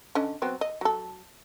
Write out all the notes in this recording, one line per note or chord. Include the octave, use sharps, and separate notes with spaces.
D3 C#4 D#5
F#3 B3 C4
D#5
F#3 A4